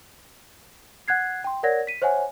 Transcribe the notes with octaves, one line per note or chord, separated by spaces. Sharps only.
F#5 F#6 G#6 C7
G5 C6
A#4 C#5 D5 F#5 G#6 A#6
B6 D#7
C5 C#5 E5 F#5 G#5